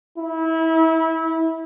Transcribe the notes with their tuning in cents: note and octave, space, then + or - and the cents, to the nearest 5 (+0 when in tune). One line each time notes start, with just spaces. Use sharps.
E4 -25